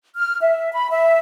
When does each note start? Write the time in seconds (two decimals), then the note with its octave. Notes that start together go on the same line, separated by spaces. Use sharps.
0.16 F6
0.41 E5
0.72 B5
0.91 E5